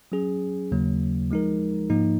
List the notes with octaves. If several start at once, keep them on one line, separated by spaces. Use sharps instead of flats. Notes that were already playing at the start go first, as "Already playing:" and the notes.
F#3 C#4 G#4
D#2 C#3 F#3 A#3
F3 G#3 D#4 A#4
G#2 F3 A#3 D#4